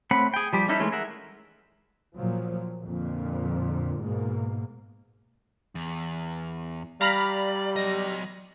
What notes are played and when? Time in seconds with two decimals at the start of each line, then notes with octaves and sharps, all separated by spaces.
0.11 A3 C4 C#5 F#5 B5
0.34 G#4 G5
0.53 F3 G3 G4
0.68 G3 C#4 D#4 E4 A4
0.80 E3 G#3 A3 C#4
0.92 G#4 A#4 E5 F#5
2.14 A#2 F3 F#3
2.82 F2 A#2 D3
4.01 G#2 B2 A#3
5.75 E2
7.01 G3 D5 F5 A#5 B5
7.76 F#3 D#5 A#6